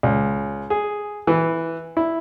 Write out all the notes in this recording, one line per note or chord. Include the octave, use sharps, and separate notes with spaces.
C#2
G#4
E3
E4